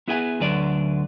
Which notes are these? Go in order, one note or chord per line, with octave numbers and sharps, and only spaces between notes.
B3 E4 G#4 B4 D5 G#5
D2 D3 F#3 B4 D5